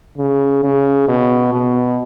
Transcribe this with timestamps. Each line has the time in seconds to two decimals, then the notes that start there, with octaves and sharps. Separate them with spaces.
0.18 C#3
0.63 C#3
1.08 B2
1.53 B2